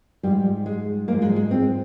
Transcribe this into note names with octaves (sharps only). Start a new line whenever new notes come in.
G#2 F3 G3
G#3
G#2 F3 A#3
G#3
G#3
C4